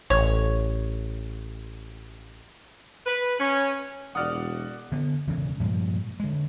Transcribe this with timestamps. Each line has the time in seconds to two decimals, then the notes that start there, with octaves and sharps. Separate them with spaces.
0.10 A1 C#5
3.06 B4
3.39 C#4
4.15 E1 F#4 D5 F#5 D#6 F6
4.92 D3 B3
5.27 E1 C#3 E3
5.60 G2 A#2 F3 G#3
6.20 D3 G#3